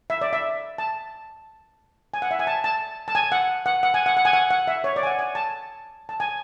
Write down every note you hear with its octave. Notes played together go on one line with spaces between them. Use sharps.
E5
D5
E5
A5
G#5
F#5
E5
G#5
A5
A5
A5
G#5
F#5
F#5
F#5
G#5
F#5
F#5
G#5
F#5
F#5
E5
C#5
D5
G#5
F#5
G#5
A5
A5
G#5